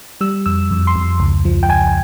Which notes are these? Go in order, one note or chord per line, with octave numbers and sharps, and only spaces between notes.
G3 E6
F2 E6
F2
C6
F2
C#2
F3
G5
C#2 G#5